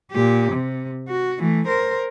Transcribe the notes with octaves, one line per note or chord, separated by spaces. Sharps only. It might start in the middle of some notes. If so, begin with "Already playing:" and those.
A#2 G4
C3
F#4
E3 A3
A#4 C5